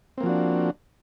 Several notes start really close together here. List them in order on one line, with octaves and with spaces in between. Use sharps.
C4 A#3 F3 F#4 D4